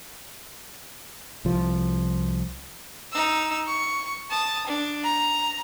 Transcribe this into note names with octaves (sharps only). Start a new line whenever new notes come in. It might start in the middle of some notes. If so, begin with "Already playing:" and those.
C2 F3
D#4 E6
C#6
A5 D#6
D4
A#5